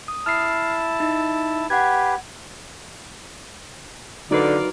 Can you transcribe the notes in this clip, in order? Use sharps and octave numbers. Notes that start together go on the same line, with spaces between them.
D#6
E4 A5 F6 C7
D#4
G4 B4 F#5 G#6
D3 F#3 D#4 F4 A#4 B4 D5